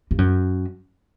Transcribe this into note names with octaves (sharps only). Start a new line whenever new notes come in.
G2
F#2